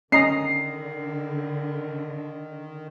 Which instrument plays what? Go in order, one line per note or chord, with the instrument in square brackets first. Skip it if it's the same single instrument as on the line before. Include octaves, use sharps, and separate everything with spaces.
[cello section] D3 [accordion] D#3 [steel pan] C#4 D#5 A#5 [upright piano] C7